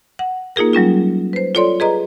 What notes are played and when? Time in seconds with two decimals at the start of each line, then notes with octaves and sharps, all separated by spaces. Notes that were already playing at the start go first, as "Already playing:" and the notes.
0.19 F#5
0.56 A#3 D#4 F4 G#4 A#4
0.73 F#3 G3 C#4 F4
1.33 B4 C5
1.55 F4 A4 C#5 D5 C6
1.80 G#4 B4 D#5 A#5